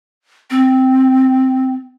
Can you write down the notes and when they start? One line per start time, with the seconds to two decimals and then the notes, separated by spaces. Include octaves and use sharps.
0.50 C4